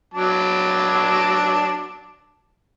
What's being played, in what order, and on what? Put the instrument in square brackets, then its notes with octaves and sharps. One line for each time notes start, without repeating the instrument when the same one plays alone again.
[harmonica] F#3 A5 D6